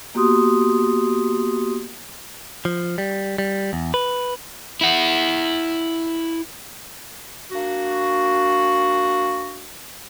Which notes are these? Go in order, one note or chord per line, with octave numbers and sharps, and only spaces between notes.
A#3 B3 F#4 G4 C6 D#6
F3
G3
G3
E2
B4
E4 F#5
A#3 D4 F#4